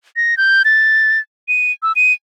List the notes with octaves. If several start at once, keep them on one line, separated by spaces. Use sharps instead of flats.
A#6
G6
A6
D#7
E6
D#7